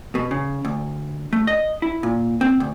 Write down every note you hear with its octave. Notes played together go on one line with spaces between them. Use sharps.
B2
C#3
D2
A3
D#5
E4
A#2
C4
D2